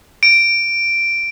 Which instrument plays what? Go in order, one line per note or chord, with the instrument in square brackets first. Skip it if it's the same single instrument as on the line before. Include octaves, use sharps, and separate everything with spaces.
[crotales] D7